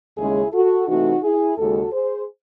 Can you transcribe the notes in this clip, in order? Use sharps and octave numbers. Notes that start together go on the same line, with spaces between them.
D#2 C#3 G#3 C#4 E4 G#4
F#4 A4
C3 E3 A3 D#4 F#4
E4 G#4
D#2 C#3 G#3 F#4 A4
G#4 C5